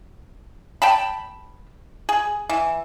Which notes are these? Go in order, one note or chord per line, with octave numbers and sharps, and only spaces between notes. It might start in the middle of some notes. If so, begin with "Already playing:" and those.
G5 A5 B5
G#4
E3